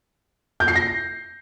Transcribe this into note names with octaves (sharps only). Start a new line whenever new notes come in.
G6
C7
A#6